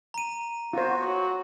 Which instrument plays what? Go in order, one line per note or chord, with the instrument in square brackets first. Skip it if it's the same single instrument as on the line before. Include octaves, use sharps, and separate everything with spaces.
[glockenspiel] A#5 D#7
[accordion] B3 F#4 [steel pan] F4 C5
[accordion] F#3 [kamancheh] F#4